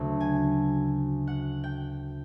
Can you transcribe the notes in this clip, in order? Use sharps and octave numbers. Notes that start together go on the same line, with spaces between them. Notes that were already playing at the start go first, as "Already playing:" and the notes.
Already playing: D2 C#3 F#3 A3
G#5
F#5
G5